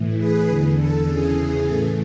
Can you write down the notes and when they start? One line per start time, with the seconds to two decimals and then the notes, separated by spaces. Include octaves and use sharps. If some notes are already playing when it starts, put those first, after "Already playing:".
Already playing: A2 E3
0.18 G#4 B4
0.47 E2 D3
0.77 A4
1.06 E2 C#3 E3 G#4
1.64 A2 E3 A4